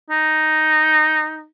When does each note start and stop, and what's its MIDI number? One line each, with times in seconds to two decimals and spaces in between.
0.10 1.46 63